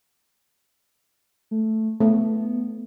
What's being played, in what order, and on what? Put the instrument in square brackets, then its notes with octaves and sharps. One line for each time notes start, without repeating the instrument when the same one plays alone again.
[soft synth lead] A3
[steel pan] A3 [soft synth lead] B3